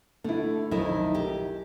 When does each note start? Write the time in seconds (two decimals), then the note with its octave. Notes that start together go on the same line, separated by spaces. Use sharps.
0.24 D3 A3 E4
0.71 B1 F2 D#3 E4
1.15 G4